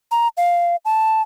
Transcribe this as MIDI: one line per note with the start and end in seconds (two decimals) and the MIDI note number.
0.12 0.28 82
0.37 0.76 77
0.85 1.22 81